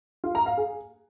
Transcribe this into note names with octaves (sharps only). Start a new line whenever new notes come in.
F4
A#5
F5
G#4